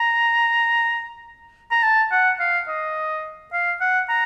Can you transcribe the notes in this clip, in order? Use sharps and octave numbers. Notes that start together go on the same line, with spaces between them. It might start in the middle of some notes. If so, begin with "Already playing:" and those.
Already playing: A#5
A#5
A5
F#5
F5
D#5
F5
F#5
A#5